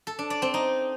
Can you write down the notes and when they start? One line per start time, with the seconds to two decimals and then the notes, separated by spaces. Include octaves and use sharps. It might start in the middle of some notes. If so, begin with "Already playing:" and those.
0.07 A4
0.19 D4
0.30 D5
0.42 C4
0.54 D#4